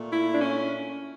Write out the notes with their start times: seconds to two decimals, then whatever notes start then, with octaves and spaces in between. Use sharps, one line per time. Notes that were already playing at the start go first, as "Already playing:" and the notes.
Already playing: A#2 A3
0.11 E4
0.33 D4
0.41 C#4